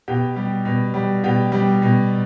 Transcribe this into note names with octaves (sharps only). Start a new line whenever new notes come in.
B2 G4
G3
B2
G3
B2 G4
G3
B2